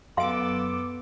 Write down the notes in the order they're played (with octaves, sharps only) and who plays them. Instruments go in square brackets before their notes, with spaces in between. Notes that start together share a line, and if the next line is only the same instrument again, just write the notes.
[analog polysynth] F#2 D6 [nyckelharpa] B3 A4 [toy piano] F5 C6